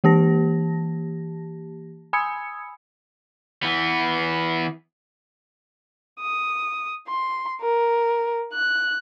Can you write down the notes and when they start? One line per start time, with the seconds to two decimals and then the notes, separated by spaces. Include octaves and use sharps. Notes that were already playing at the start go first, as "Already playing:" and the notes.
0.04 E3 A#3 G4 A5 A#6
2.13 G#5 B5 D#6 E6 G#6 C#7
3.63 E3 B3
6.20 D#6
7.09 C6
7.62 A#4
8.54 F#6